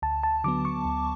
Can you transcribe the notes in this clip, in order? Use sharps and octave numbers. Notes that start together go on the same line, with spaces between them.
D2 A5
A5
D3 F#3 B3 D6
C#6
D2